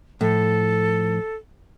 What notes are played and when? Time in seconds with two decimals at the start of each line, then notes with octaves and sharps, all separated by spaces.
0.21 A2 F3 A4